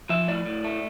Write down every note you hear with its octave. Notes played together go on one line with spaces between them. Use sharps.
F3 E5
A2 D5
A2
A3